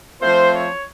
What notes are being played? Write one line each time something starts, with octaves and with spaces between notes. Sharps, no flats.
F3 A3 C4 F4 C5
C#5